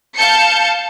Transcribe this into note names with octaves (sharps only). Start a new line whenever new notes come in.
F5 A5 G6 C#7